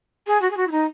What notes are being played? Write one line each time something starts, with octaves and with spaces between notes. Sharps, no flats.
G#4
F#4
G#4
F#4
E4
D#4